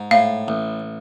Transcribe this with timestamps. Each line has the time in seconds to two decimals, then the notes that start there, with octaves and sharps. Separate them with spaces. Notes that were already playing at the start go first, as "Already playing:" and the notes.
Already playing: G#2
0.11 A2 F5
0.48 A1